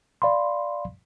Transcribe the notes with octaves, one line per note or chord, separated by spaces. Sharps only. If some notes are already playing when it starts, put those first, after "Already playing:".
D5 F5 B5 C6